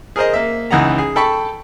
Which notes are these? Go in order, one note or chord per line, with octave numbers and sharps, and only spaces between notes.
G#4 A#4 C5 D#5
A#3 E5
C#2 E3 D#4 F#5 A#5
G#4
A4 G5 A5 B5 C#6